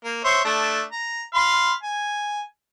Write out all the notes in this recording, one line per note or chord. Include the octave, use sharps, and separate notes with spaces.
A#3
C5 C#5 E5
A3 D4
A#5
F5 B5 C6
G#5